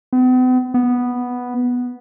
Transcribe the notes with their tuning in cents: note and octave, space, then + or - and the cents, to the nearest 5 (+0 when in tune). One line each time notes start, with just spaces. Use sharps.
B3 +45
B3 -5